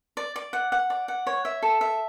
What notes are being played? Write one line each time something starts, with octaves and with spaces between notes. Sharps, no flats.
D5
D5
F#5
F#5
D5
F#5
C#5
E5
A4
E5